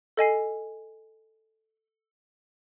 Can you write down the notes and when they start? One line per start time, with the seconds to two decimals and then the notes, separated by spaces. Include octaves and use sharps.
0.17 A4 D#5 G#5 C7